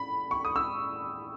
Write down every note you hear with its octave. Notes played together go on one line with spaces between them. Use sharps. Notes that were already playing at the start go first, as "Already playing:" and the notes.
Already playing: B5
C#6
D#6
E6